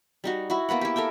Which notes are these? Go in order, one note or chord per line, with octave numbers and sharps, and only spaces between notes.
G3 D#4 F#4
E4 F#4
A#3 B3 B4 F#5
E4 G4
A4 A#4 E5 G5